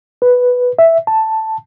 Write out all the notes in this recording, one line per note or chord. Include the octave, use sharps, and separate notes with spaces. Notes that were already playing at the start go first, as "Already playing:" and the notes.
B4
E5
A5